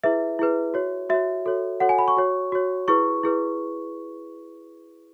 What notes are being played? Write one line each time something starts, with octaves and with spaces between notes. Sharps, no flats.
E4 G#4 B4 E5
E4 G#4 B4
F#4 C#5
F#4 C#5 E5
F#4 A4 C#5
F#4 A4 C#5 F#5
G#5
B5
C#6
F#4 C#5
F#4 C#5
E4 G#4 B4 C#6
E4 G#4 B4